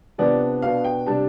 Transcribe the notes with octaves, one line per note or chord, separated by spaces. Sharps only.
C3 F3 B3 D4 D5
B2 B3 D4 F5
G5
C3 G3 D4 A5